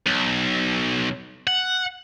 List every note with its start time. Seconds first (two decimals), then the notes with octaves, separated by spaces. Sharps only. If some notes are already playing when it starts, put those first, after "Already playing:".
0.07 B1
1.47 F#5